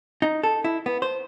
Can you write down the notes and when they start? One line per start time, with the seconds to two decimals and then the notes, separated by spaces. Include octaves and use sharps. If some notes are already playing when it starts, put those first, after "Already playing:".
0.22 D#4
0.43 A4
0.64 E4
0.86 B3
1.02 C5